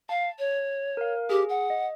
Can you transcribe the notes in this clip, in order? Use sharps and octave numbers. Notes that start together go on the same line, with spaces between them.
F5 A5
C#5
A#4 F5
G4 G#4
F#5
D#5